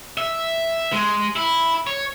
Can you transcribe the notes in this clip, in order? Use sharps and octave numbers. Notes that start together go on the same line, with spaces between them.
E5
G#3
E4
C#5